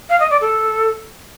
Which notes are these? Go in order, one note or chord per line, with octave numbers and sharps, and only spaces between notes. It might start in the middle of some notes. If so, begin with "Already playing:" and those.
F5
D#5
D5
A4